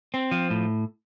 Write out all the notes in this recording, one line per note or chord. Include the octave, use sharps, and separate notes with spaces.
C4
F3
A2